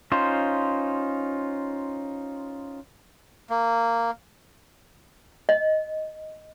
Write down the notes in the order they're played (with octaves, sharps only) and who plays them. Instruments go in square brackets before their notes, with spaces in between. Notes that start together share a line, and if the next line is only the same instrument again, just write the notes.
[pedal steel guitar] C#4 D#4 F4 C5
[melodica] A#3
[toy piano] D#5